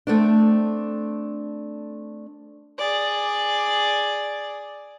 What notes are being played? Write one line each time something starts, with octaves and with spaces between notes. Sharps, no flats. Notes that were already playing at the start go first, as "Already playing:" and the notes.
A3 C4 D4
G#4 D5